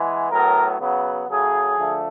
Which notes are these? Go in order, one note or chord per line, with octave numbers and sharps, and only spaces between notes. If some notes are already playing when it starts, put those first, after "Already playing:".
Already playing: E3 G#3 B3
A2 F#3 B3 A#4
C#3 F#3 B3
C#3 F#3 A3 G#4
D3 F3 A3